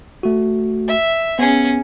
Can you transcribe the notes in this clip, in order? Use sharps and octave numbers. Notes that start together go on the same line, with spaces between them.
A3 F#4
E5
B3 C#4 G#4